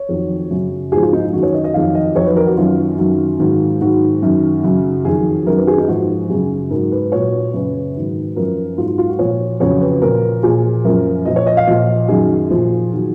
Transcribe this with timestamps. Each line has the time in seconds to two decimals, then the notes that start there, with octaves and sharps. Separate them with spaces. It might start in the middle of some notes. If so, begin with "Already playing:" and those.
Already playing: C#5
0.09 F2 D#3 F#3
0.50 F#2 C#3 F#3
0.92 G#2 F3 G#4
1.02 F4
1.13 D#4
1.23 F4
1.33 F#2 D#3 F#3 F#4
1.43 C#5
1.54 D#5
1.64 D#5
1.74 F2 D#3 F#3 F5
1.95 D#5
2.15 F2 D#3 F#3 C#5
2.26 B4
2.36 A#4
2.47 F#4
2.57 F#2 D#3 F#3 F4
2.98 F#2 D#3 F#3
3.40 G#2 D#3 F#3
3.81 G#2 D#3 F#3 F#4
4.22 F#2 D#3 F#3
4.64 F#2 C#3 F#3
5.05 F2 D#3 F#3 G#4
5.46 F#2 D#3 F#3 A#4
5.57 B4
5.67 G#4
5.78 D#4
5.88 G#2 F3 F#4
6.29 F#2 C#3 F#3 G#4
6.70 G#2 F#3 A#4
6.92 B4
7.12 A#2 F#3 C#5
7.53 F#2 C#3 F#3 B4
7.95 G#2 D#3 F#3
8.36 F#2 F3 A#4
8.77 G#2 F4
8.81 F#3
8.88 F4
8.98 F4
9.09 F#4
9.19 A#2 F3 C#5
9.60 F2 C#3 F#3 C#5
9.81 B4
10.02 A#2 F3 A#4
10.43 A#2 F3 G#4
10.85 F#2 F3 A#4
11.25 A#2 F3 D#5
11.36 C#5
11.47 D#5
11.57 F5
11.67 A#2 F3 D#5
12.08 F#2 D#3 F#3 G#4
12.50 A#2 F3
12.93 D#3 F#3